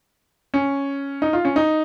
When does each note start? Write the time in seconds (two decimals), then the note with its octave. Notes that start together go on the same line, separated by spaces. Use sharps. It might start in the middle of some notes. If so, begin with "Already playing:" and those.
0.54 C#4
1.22 D#4
1.33 F4
1.45 C#4
1.56 D#4